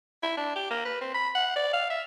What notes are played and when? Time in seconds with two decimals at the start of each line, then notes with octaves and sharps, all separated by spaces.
0.23 E4
0.37 D4
0.56 G4
0.71 A#3
0.85 B4
1.01 C4
1.15 B5
1.35 F#5
1.56 D5
1.74 F5
1.90 E5